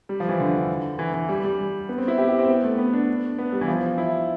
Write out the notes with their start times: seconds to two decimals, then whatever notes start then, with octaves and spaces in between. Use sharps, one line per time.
0.09 G3
0.20 F3
0.29 E3
0.40 D3
0.99 E3
1.14 E3
1.29 G3
1.44 G3
1.89 B3
1.98 C4
2.08 E4
2.18 G4
2.29 G4
2.39 C4
2.48 B3
2.63 A3
2.78 B3
2.93 D4
3.38 B3
3.52 G3
3.61 E3
3.68 F3
3.98 E4